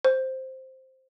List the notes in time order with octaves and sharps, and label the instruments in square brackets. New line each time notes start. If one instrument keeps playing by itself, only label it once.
[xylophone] C5